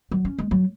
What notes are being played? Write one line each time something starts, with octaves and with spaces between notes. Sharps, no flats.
F#3
C#4
G#3
F#3